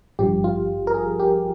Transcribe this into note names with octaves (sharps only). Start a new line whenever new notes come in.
G#1 G2 F3 G4
F4
A#4
G#4
G4